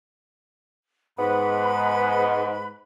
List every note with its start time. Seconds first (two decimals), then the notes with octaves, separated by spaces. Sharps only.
1.19 G#2 B3 B4 B5